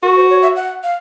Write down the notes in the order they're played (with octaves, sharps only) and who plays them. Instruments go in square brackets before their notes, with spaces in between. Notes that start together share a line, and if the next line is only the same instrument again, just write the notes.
[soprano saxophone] F#4 [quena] A#4
[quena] C5
C#5
E5
F#5
F5